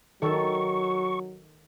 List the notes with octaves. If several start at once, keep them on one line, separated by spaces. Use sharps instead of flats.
D#3 F#3 A4 C#6